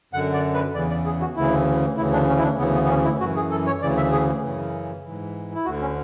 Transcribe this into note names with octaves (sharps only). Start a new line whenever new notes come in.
F#2 D3 F#5
D5
B4
E2 C#3 E3 D5
D5
G#4
F#4
D2 C#3 E3 E4
D2 C#3 E3 E4
D4
C#4
E4
D4
D2 C#3 E3 B3
B3
B3
C#4
E4
F#2 E3 F#4
G#4
A4
C#5
D2 C#3 E3 D5
E5
G#4
F#2 C#3 E3
G#2 E3
E4
D2 D3 F#4
C#4